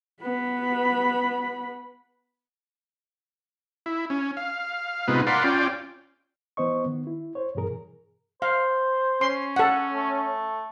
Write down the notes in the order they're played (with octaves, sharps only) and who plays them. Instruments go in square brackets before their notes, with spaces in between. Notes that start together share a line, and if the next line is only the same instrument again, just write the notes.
[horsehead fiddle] B3 B5
[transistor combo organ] E4
C#4
F5
C3 G#3 B3 D#4 F4 B4
A#4 D5 F5 F#5 B5 C6
C#4 F4 D5 G5
[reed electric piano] E3 B3 C5 D#5 C#6
D#3 B3
E4
C5 C#5
G2 B2 E3 G#4 A#4
[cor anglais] C5 [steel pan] F5
[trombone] C#4 [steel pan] C6
[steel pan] A4 F#5
[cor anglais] A3